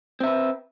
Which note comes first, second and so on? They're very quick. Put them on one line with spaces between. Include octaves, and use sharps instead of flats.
C4 E5 B4